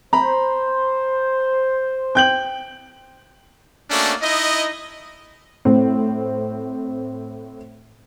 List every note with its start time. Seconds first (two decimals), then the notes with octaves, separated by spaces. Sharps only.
0.13 C5 A#5 B5
2.15 G5 G6 F#7
3.90 A3 A#3 C#4 D4 F#4
4.22 D#4 E4 D#5
5.65 A2 C4